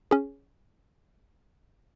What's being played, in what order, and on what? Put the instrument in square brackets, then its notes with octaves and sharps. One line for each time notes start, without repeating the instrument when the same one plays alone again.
[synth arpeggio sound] C#4 G#4